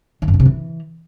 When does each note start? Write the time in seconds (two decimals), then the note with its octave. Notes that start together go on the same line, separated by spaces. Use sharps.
0.22 D#3
0.28 F#2
0.34 B2
0.40 C3
0.46 E3